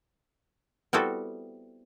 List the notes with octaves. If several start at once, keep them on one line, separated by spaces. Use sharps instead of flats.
G3 B3 C4 E4 F#4 A4